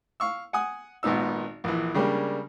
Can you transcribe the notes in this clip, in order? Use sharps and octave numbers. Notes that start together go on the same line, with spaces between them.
F5 C#6 E6
F#5 G#5 D#6
G#1 A#2 B3 D#4 E6
A#1 E3
C#3 G3 G#3 A#3 D4